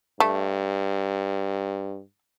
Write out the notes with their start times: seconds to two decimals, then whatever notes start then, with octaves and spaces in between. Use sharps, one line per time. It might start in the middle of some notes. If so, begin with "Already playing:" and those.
0.20 G2 A3